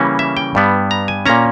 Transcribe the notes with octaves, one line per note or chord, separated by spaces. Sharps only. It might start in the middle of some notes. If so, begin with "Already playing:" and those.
Already playing: C#3 E3 G3 A#3 C#4
E5
G5
G2 G3 B3
A#5
G#5
A#2 A#3 C#4 A#5